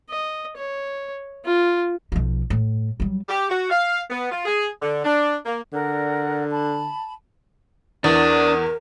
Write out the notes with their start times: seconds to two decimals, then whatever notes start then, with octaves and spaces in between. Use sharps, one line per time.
0.10 D#5
0.57 C#5
1.45 F4
2.12 B1 F3
2.50 A2
3.00 F#3 G3
3.29 G4
3.50 F#4
3.70 F5
4.10 B3
4.32 F4
4.45 G#4
4.82 D3
5.04 D4
5.46 A#3
5.73 D3 A#4 D5 F#5
6.50 A5 B5
8.04 E2 E3 D4 A#4 D#6